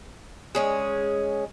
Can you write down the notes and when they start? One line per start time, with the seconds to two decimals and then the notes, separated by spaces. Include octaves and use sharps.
0.55 G#3 C#4 G#4